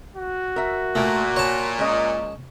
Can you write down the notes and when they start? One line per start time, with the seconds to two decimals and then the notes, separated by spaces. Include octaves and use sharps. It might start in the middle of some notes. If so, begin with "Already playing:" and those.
0.16 F#4
0.56 A#4 E5
0.95 A#2 A3
1.36 C#5 A5
1.79 G#3 C#4 D#5